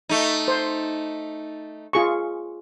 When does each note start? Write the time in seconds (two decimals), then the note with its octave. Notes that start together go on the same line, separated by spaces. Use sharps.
0.09 A3 D#4
0.48 C5
1.93 F4 G#4 C#6